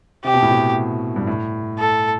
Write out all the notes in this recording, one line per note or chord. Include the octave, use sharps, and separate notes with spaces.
C3 G4
B2
A2
B2
G2
A2
A4